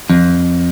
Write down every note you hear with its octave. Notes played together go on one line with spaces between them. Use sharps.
F2